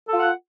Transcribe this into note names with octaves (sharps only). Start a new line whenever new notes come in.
F4 A4 F#5